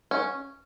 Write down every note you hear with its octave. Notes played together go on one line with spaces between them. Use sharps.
C#4